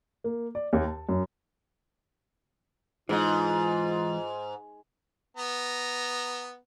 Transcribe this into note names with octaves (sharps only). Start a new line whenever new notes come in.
A#3
D5
D#2
A5
F#2
G#2 E3 G#3 D#4 F4
B3 A#5